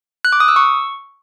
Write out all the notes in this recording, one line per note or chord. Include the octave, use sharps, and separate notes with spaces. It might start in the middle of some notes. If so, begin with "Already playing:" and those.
F#6
D6
D#6
E6
C#6